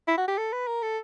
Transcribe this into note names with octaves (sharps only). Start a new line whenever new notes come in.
E4
F#4
G4
A4
B4
A#4
A4